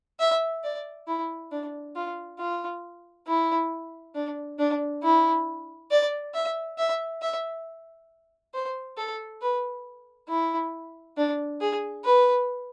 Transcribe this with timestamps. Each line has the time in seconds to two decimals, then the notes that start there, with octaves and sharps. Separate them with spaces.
0.20 E5
0.64 D5
1.08 E4
1.51 D4
1.95 F4
2.39 F4
3.27 E4
4.15 D4
4.59 D4
5.03 E4
5.91 D5
6.34 E5
6.78 E5
7.22 E5
8.54 C5
8.97 A4
9.41 B4
10.29 E4
11.17 D4
11.61 G#4
12.05 B4